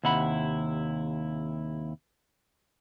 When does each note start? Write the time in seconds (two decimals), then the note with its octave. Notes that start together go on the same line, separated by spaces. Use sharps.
0.04 D#2 C3 E4 F#5 B5